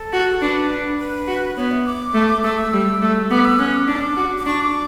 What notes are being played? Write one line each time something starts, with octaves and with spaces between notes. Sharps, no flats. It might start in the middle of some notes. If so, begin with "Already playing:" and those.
Already playing: A4
F#4
D4 B4
D4
B4
F#4
B3 C#5
E5
D6
A3
A3 E6
E6
G3
A3
B3 D6
E6
C#4 F#6
D6
D4 D6
F#4
D6
D4 C#6
D6